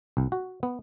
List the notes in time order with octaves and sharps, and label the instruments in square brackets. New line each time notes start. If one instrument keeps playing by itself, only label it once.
[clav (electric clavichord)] C2
F#4
B3